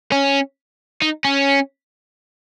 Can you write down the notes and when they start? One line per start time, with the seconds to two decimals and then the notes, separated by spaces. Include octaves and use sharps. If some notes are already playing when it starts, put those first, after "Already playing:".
0.12 C#4
1.02 D#4
1.25 C#4